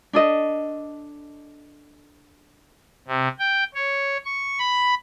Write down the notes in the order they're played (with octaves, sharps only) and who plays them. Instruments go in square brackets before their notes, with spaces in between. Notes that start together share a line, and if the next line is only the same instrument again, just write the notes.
[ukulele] D4 A4 D#5
[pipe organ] C3
G5
C#5
C#6
B5